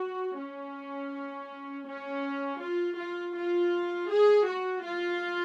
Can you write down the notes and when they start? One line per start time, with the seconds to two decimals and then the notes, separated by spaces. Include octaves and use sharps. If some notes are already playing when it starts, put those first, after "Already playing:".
Already playing: F#4
0.38 C#4
1.88 C#4
2.62 F4
2.98 F4
3.36 F4
4.10 G#4
4.47 F#4
4.85 F4